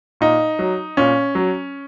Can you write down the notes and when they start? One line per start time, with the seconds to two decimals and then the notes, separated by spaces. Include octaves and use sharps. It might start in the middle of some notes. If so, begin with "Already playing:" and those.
0.21 A#2 D#4
0.59 F#3
0.97 A#2 C#4
1.35 F#3